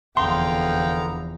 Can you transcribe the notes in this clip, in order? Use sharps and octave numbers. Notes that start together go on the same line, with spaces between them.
F1 E2 D3 B3 F5 G5 A#5 C6